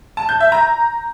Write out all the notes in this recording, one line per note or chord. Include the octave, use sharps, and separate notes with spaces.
A5
G6
E5
A#5